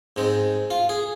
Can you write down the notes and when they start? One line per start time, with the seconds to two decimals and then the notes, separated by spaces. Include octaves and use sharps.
0.16 G#2 G#3 C4
0.70 F4
0.89 G#4